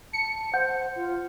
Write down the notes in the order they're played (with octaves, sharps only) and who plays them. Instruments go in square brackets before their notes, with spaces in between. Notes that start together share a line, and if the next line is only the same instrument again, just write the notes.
[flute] A5 [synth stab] C#7
[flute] C5 [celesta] F#5 G6
[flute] F4